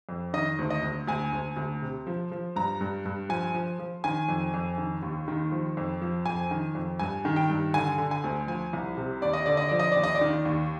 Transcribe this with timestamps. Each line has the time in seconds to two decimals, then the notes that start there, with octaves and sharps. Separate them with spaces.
0.09 F2
0.34 D#3 D#5
0.59 D2
0.70 D#5
0.83 D2
1.07 D2 G#5
1.33 D2
1.57 D2
1.82 C3
2.07 F3
2.32 F3
2.56 G2 A#5
2.81 G2
3.06 G2
3.29 F3 G#5
3.54 F3
3.79 F3
4.04 D#3 G#5
4.29 F2
4.54 F2
4.78 D#3
5.02 D#2
5.28 D#3
5.52 F3
5.77 F2
6.02 F3
6.26 F2 G#5
6.51 D#3
6.75 F2
6.99 G2 G#5
7.25 D#3
7.36 G5
7.50 G2
7.74 D3 G#5
7.98 D3
8.11 G#5
8.24 D2
8.47 F3 G#5
8.73 C2
8.97 C3
9.22 D#2 D5
9.33 D#5
9.46 D3 D5
9.57 D#5
9.69 F3 D5
9.79 D#5
9.92 D#2 D5
10.04 D#5
10.15 D5
10.21 D#3
10.45 D#2